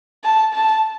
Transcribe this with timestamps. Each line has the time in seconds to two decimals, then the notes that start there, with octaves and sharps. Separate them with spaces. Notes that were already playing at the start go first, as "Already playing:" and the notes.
0.24 A5
0.53 A5